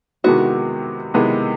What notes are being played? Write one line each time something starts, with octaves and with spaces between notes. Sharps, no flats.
C3 D#3 G#3 B3 E4 F#4
C3 D#3 G#3 B3 E4